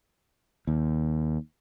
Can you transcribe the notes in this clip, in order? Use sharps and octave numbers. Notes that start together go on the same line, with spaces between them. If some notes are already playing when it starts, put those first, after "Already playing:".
D#2